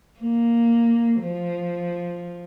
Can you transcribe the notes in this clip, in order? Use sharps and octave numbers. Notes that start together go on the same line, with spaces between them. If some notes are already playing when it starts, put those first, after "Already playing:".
A#3
F3